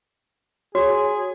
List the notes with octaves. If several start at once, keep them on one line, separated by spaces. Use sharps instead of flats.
F#4 G#4 C#5